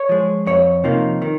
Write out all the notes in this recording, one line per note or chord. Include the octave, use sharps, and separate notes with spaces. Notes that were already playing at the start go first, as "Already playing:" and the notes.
Already playing: C#5
F3 G#3
F2 C#5
C3 F3 A#3 D#4
D#3